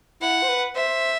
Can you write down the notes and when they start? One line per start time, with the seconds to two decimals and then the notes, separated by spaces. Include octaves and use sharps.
0.21 E4 F#5
0.43 C5
0.48 B4
0.75 C5 E5